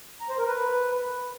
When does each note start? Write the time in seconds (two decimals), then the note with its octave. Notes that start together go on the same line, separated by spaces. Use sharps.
0.21 A#5
0.30 C5
0.38 A#4
0.47 B4